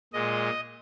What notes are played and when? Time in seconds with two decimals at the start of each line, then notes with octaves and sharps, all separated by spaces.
0.13 A#2 G#3 D#5